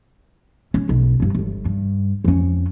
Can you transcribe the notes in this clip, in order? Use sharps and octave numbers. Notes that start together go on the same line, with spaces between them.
C#4
B1
F1 G2
D1 G1
G2
F2 C#4